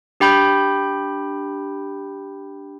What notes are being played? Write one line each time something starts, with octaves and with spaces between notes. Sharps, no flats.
D4 G4 G5 B5 G6